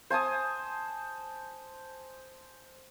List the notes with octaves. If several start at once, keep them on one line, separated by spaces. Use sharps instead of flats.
C5 G#5 A5 D#6